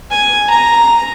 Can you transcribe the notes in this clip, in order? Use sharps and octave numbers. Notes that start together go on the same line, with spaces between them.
G#5
A#5